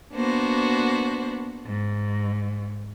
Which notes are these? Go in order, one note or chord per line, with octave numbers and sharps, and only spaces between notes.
A#3 B3 D4 F#4 C5
G#2